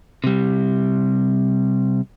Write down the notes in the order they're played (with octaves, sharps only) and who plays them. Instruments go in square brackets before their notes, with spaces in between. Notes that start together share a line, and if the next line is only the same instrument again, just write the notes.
[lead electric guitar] C3 G3